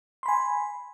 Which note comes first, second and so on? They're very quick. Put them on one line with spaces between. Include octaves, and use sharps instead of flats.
C6 B5 G#5